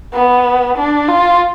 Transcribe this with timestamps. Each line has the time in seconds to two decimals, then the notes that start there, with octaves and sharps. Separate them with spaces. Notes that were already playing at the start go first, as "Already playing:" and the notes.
0.13 B3
0.78 D4
1.09 F4